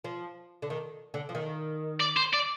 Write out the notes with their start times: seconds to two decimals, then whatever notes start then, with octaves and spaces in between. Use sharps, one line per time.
0.04 F3
0.62 D3
0.70 D#3
1.14 D3
1.29 F3
1.35 D#3
2.00 D5
2.17 C5
2.34 D5